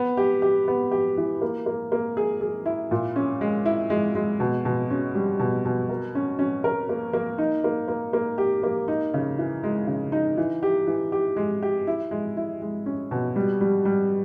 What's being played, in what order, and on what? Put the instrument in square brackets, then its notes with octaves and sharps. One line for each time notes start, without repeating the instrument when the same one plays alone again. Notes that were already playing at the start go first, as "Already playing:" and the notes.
Already playing: [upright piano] B3
G4
G4
B3
G4
E3
A#3
A#3
A#3
G#4
G#4
E4
A#2
C#4
G#3
E4
G#3
G#3
B2
B2
C#4
G3
B2
B2
A#4
C#4
C#4
A#4
A#3
A#3
D#4
A#3
A#3
A#3
G4
A#3
D#4
C#3
E3
G#3
C#3
D#4
E3
G4
E3
G4
G#3
G4
E4
G#3
E4
G#3
C#4
B2
G3
G3
G3